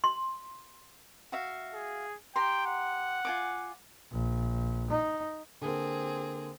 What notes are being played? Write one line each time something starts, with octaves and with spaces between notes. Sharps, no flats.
C6
F#4 E5 F5
G#4
G4 G5 A#5 C6
F#5
F4 G#5 D6
A#1
D#4
D3 A#3 C4 G#4